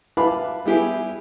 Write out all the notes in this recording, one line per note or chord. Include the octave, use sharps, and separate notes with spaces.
B4 E5 F5 A5 B5 D6
G3 B3 E4 G4 G#4